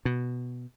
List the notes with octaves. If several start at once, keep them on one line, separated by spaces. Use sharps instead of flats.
B2